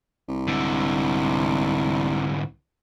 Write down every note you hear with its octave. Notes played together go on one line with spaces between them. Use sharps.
C2
G#2 D3